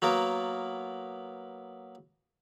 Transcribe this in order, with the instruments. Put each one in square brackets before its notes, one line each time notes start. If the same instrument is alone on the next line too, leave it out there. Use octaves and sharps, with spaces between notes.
[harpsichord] F#3 A#3 B3 A#4